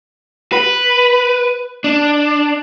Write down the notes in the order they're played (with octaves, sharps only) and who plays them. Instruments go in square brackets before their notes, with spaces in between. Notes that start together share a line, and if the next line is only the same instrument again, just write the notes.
[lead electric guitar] B4
D4